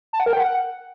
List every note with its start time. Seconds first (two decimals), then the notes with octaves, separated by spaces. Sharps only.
0.13 A5
0.20 F#5
0.26 A#4
0.33 G5
0.40 F#5